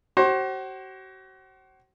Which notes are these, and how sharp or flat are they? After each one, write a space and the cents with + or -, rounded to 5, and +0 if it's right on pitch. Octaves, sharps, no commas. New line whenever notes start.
F#4 +40 C5 +35